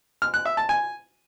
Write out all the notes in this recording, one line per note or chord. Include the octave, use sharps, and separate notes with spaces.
F6
F#6
E5
A5
G#5